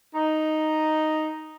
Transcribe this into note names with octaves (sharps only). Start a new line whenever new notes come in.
D#4